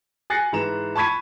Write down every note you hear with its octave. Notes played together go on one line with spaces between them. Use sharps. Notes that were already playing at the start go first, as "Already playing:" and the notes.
G#5 F#6 A6 A#6 C7 C#7
G#2 E3 B4 A#5 E7
A5 B5 C#6 G#6 B6 D#7